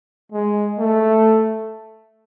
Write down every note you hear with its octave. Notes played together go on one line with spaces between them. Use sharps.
G#3
A3